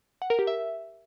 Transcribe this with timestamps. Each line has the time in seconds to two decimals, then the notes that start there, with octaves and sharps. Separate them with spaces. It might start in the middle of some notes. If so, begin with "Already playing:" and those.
0.22 F#5
0.30 A#4
0.39 G4
0.47 E5